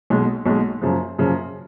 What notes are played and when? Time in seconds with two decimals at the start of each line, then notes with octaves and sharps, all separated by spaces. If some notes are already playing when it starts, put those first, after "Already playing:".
0.10 B1 B2 G#3
0.46 B1 B2 G#3
0.82 F#2 C#3 F3
1.19 F#2 C#3 F3